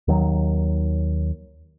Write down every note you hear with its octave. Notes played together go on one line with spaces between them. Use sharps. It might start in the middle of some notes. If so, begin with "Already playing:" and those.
D#2 D#3 F#3